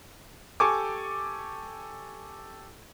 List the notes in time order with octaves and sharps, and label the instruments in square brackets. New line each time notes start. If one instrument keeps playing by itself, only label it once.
[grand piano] G4 A4 G#5 C#6 D6